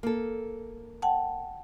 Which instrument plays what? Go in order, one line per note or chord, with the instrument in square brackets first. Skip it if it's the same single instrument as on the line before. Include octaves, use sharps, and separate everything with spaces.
[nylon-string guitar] A#3 A4
[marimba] F#5 G5 A5